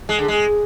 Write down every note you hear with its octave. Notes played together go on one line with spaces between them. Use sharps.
G#3
D3
G#3